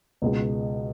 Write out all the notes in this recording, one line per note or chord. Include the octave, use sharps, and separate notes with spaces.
C#2 B2 G#3